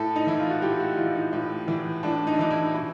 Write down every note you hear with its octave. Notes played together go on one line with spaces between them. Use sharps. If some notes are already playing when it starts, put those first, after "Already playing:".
Already playing: A2 A4
D#4
E3 E4
F4
F#4
A2 G4
F#4
E3 F4
D#4
A2
E3
A2 D4
D#4
D4
E3 D#4
E4
B2 E4